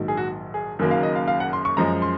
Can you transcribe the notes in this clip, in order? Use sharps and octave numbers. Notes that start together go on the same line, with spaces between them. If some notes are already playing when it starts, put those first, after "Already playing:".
Already playing: A#1 G#2 D#3 F#3
G#4
F#4
G#4
F#1 F#2 D#3 F#3 A#3
F5
D#5
F5
F5
F#5
C6
C#6
F#2 F3 G#3 A#5
C6